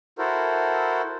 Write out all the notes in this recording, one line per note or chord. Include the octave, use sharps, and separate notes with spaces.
E4 F#4 A4 A#4 C5